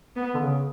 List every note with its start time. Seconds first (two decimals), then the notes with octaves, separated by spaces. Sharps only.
0.16 B3
0.35 D3
0.39 C#3